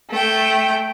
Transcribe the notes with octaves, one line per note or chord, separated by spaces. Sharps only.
A3 G5